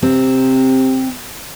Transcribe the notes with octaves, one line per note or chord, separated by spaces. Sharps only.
C3 C4